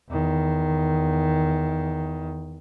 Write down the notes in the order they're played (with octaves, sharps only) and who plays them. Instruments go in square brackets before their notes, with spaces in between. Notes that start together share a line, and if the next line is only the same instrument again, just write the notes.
[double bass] E2 D#3